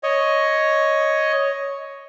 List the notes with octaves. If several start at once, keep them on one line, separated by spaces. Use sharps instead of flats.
C#5 D#5